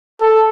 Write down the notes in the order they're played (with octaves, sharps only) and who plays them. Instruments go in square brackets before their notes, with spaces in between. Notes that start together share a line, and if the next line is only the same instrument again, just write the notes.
[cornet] A4